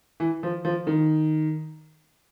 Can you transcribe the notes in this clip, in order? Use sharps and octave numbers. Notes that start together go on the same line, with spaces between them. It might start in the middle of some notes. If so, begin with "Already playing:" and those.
E3
F3
F3
D#3